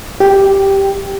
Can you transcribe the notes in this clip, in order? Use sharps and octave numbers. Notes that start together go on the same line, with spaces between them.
G4